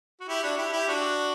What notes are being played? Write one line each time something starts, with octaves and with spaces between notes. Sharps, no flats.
F#4
E4 G4
D4 F#4
E4 G4
E4 G4
D4 F#4